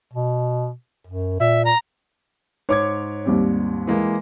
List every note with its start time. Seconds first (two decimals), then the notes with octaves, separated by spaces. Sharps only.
0.13 B2
1.07 F#2
1.40 A#2 E5
1.65 A#5
2.69 G#2 C#5 D6 G#6
3.25 D#2 G3 C4
3.87 E3 G#3 A#3